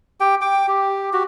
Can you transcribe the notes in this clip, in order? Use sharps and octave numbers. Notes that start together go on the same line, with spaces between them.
G4 G5
G5 D6
G4
F#4 G4